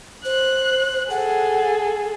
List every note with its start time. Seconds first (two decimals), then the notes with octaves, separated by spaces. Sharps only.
0.25 C5 F#6
1.11 G#4 A4 F#5